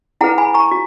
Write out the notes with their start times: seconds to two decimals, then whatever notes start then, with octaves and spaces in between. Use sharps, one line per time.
0.21 E4 G#4 B4 F#5 A#5
0.38 G#5 B5
0.54 A#5 C#6
0.71 F#4